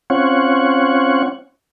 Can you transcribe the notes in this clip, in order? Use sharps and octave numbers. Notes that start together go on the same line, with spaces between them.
C4 C#4 F4 C#5 F#5